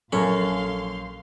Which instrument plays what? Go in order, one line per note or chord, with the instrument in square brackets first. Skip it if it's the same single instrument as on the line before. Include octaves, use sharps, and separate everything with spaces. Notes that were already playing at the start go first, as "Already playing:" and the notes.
[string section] A#1 F5 C6 [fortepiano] F#2 [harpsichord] C#4 [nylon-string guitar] A4 A#4 C#5